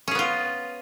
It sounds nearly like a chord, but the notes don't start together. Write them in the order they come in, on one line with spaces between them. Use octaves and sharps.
C#4 G#4 B3 F4